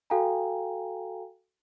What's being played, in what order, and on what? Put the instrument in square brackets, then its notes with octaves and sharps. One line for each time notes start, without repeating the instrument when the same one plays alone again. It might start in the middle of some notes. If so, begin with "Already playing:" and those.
[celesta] F#4 A4 F5 G5 G#5 A#5